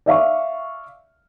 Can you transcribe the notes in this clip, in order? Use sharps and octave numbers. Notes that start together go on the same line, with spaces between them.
D5 E5 F5 C#6